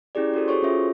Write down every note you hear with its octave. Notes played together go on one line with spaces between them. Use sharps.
C#4 E4 G4 G#4 D5
F#4 G4 A4 C5
F#4 G#4 A4 C5 C#5 C#6
C#4 F4 C#5 E5